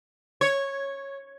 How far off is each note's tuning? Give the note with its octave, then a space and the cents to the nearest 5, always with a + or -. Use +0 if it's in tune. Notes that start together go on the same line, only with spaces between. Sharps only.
C#5 -10